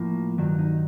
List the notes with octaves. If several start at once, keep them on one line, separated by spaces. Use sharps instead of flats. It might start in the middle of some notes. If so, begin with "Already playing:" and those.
Already playing: A2 F3 A#3
G2 D#3 F#3
D#4